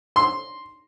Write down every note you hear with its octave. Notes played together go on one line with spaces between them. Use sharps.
C6